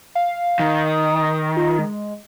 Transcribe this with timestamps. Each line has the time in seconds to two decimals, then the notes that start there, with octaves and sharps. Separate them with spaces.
0.15 F5
0.59 D#3
0.86 D#6
1.57 F4
1.79 G#3